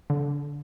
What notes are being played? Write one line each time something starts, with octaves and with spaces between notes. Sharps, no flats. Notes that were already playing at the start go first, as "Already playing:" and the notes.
D3